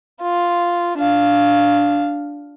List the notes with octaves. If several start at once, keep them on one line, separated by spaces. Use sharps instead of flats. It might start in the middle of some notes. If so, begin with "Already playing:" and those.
F4
D4 F5